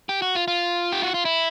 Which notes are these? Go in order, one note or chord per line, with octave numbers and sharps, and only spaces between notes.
G4
F#4
F4
F4
G4
F#4
F4
E4